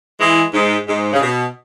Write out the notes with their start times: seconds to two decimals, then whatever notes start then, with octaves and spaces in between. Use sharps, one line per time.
0.19 E3 G#3
0.54 G#2
0.87 G#2
1.13 C#3
1.20 B2